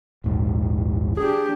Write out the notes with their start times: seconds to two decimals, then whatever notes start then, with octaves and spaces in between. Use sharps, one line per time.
0.24 D#1 A#1 G#2
1.17 D4 G4 G#4